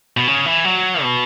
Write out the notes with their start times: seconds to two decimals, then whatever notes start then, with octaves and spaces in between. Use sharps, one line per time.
0.17 B2
0.27 C#3
0.46 E3
0.64 F#3
1.02 B2